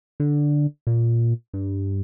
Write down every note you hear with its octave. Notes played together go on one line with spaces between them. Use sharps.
D3
A#2
G2